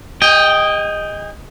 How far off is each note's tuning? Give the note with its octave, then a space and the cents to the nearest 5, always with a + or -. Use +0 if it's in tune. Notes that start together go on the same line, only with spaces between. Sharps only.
G#4 -40 D#5 +0 G5 +0